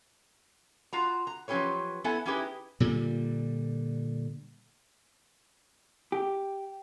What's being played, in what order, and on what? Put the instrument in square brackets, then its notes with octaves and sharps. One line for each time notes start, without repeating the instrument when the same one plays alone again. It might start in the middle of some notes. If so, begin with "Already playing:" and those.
[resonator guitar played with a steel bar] F4 F#4 A#5
A#5
F3 F#3 C#4 G4 B4 C#5
B3 E4 A4 B4 E5 G#5
C#4 D#4 E4 G4 G#4 B4
[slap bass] A#2 D3 G3
[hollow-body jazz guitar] G4